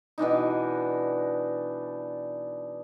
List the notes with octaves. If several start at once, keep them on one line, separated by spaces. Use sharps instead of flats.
B2 E3 D4 D#4